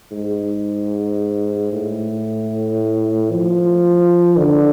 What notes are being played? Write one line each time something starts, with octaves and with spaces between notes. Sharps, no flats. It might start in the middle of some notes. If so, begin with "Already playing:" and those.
G#2
A2
F3
D3